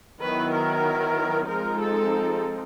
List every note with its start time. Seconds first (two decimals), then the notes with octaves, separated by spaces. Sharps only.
0.21 D#3 F#3 B3 E4 B4
0.53 A#4
1.48 F3 G#3 C4 D#4 A#4
1.80 A4